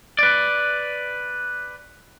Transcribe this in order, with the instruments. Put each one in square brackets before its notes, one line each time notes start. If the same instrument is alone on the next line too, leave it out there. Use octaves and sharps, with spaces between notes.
[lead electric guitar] B4 D5